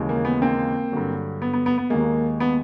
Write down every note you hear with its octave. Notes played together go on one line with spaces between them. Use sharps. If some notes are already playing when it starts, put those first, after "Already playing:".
Already playing: D#2 C#3 E3 G#3
A#3
B3
A#3 C4
G2 D3 F#3
B3
B3
B3
B3
D#2 D#3 G#3 A#3
B3